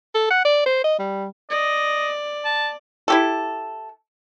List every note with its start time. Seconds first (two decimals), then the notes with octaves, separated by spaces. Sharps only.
0.14 A4
0.31 F#5
0.45 D5
0.66 C5
0.84 D#5
0.99 G3
1.50 D5 D#5
2.45 A5
3.08 E4 G4 A4